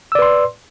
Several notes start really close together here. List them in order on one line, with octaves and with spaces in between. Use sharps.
E6 D5 B4 C6